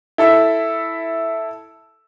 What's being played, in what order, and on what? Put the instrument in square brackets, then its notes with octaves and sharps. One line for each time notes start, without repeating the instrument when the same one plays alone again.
[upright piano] E4 A4 E5